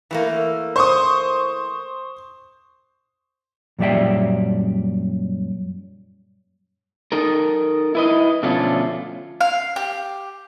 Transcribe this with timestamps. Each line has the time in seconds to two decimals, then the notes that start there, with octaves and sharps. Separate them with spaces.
0.11 E3 A3 A#3
0.76 C5 C#6 D#6
3.79 F#2 A#2 G3 D5 E5 G5
7.12 D#4 A4 A#4
7.95 E4 B4 D#5
8.43 B2 D3 F3 A3 C#4 F4
9.41 F5
9.76 G4